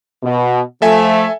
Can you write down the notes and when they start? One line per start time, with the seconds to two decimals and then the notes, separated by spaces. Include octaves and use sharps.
0.23 B2
0.82 F3 A3 A4 E5 G#5